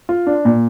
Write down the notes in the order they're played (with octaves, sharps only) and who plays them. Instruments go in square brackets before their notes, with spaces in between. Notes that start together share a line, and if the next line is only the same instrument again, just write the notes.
[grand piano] F4
D4
A#2